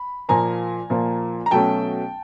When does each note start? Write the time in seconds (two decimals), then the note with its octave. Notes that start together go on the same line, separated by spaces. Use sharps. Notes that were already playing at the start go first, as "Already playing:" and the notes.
Already playing: B5
0.29 A#2 F3 A#3 G#5 A#5
0.90 A#2 F3 A#3
1.46 A#5
1.51 B2 F#3 A3 C#4 G5 A5